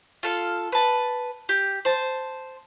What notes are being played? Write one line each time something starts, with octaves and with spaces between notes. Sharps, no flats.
F4 A4 F5
B4 A5
G4
C5 A5